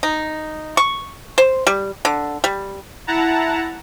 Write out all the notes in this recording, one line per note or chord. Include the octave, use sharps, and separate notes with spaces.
D#4
C#6
C5
G3
D3
G3
E4 F#5 A5 A#5